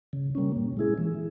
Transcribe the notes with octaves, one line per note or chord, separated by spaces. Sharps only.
C#3
G3 A#3 C#4
A#2
G#3 E4 G#4
E3